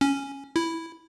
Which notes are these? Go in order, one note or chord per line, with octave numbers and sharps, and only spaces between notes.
C#4
E4